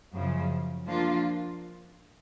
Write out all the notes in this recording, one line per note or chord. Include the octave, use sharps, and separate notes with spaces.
F#2 C#3 F3
F3 A#3 D4 F4